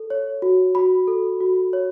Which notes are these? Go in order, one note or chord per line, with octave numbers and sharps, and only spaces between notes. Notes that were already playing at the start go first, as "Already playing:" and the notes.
Already playing: A4
C#5
F#4
F#4 B5
A4
F#4
C#5